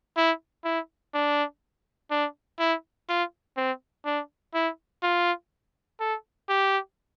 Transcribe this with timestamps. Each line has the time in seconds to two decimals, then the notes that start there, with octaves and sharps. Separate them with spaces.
0.17 E4
0.65 E4
1.14 D4
2.11 D4
2.59 E4
3.09 F4
3.57 C4
4.05 D4
4.54 E4
5.02 F4
6.00 A4
6.49 G4